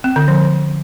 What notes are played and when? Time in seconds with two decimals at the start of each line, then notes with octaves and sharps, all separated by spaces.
0.04 C4
0.16 D3
0.28 F3